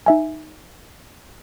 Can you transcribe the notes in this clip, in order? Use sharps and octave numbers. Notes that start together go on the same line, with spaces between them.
D#4 E5 G#5